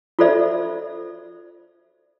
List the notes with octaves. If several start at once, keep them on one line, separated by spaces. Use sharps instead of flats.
F4 F#4 A4 C5 D5 E5